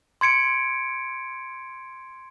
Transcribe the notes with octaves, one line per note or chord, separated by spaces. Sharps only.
C6 G#6 C#7 D7